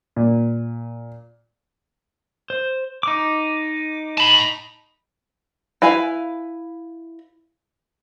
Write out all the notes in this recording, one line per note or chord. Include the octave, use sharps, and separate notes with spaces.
A#2
C5
D#4 D6
A5 B5
E4 B4 F5 G#5